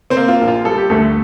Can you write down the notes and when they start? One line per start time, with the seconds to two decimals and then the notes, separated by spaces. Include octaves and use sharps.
0.10 C4 C5
0.17 A#3
0.28 F4
0.41 A#1
0.48 F4
0.65 G3 A4
0.78 G4
0.90 D2 A3 A4